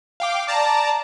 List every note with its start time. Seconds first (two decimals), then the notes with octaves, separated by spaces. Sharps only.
0.20 F5 G5 D6
0.47 D5 A5 A#5